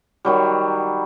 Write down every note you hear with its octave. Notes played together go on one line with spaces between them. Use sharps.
D#3 F#3 G3